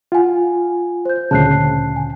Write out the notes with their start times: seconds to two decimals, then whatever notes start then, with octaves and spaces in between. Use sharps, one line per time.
0.12 F4 F#5 G#5
1.05 C5 G6
1.31 D2 A#2 C#3 A5 F#6 C7
1.96 G#5